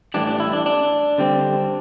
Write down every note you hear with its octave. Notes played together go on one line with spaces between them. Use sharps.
A2 E3 G3 D4
D4
E4
D4
D4
D3 G3 C4